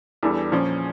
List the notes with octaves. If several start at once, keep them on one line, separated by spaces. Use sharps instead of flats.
E2 E3 G3 D4 A4
A#2 F3 C#4